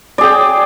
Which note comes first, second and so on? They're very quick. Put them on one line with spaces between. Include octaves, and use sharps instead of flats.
D5 G#4 G5